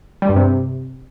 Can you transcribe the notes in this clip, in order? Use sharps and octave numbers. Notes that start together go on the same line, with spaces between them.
G3
G2
C3